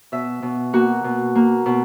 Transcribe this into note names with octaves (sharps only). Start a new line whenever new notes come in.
B2 E5
B2
A#3 F#4
B2
A#3
B2